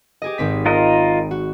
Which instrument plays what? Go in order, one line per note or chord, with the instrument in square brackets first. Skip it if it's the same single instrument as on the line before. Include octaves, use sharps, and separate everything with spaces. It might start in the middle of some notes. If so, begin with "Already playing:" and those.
[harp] G4 G#4 D#5
G#1 C4 B6
[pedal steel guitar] F4 A#4 D#5
[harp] F#4